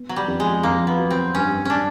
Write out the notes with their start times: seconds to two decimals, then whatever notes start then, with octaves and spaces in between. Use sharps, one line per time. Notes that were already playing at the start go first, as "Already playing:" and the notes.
Already playing: B3
0.09 F#3
0.16 G3
0.28 F2
0.40 G#3
0.63 F2 A#3
0.87 B3
0.99 F#3
1.10 C4
1.35 G2 C#4
1.65 C#4 D4